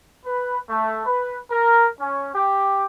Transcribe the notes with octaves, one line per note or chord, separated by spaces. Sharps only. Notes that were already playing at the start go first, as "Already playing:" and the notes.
B4
A3
B4
A#4
C#4
G4